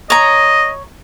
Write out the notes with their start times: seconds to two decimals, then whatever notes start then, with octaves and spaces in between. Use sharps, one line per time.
0.10 C#5 D#5 A#5